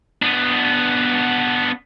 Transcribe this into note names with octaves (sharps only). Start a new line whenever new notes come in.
B3 D4